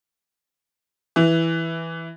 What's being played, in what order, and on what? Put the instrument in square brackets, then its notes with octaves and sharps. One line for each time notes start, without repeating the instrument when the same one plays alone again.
[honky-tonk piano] E3